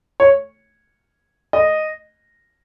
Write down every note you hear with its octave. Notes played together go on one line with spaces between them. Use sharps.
C#5
D#5